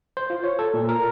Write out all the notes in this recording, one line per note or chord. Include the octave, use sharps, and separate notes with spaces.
C5
F4
C#5
A4
A#2
A#4